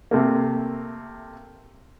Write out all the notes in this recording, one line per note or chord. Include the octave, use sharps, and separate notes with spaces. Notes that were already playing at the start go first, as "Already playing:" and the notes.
C3 A3 A#3